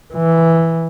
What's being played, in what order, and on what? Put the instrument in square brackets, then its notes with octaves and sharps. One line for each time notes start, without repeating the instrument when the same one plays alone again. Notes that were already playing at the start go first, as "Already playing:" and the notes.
[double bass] E3